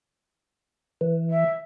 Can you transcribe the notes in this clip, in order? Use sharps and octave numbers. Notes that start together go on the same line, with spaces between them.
E3
E5